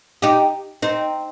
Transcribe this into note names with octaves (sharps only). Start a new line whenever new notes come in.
D#4 G4
C4 D#4